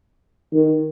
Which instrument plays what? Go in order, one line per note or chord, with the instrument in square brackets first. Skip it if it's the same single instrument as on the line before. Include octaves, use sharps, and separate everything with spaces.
[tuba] D#3